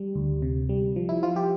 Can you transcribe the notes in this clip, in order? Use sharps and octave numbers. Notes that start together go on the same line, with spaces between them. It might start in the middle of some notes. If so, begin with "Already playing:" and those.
Already playing: G3
D2
C3
G3
F3
E4
F3 F4
G4